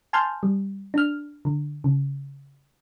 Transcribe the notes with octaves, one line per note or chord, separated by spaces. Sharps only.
G#5 A5 C6 F6 G6
G3
D4 F6
D3
C#3